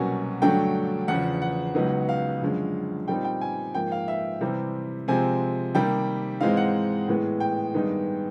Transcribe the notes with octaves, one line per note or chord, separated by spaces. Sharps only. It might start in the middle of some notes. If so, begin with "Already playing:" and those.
Already playing: C2 B2 F#3 A#3 C#4 G#5
G2 D3 F#3 A3 D4 G5
E2 C#3 F3 F#5
F#5
C#2 C#3 F#3 B3 D#4
F5
F#2 D3 F3 G#3 C#4
A#2 G3 C4 D#4 G5
G5
G#5
G#2 F3 A#3 G5
F5
E5
C3 E3 G3 C4
C3 F3 G#3 C4 G#5
C3 D#3 G3 A#3 G5
G#2 E3 G#3 C4 D#4 F5
F#5
A2 E3 G#3 B3
G5
G2 D#3 G#3 B3 D#4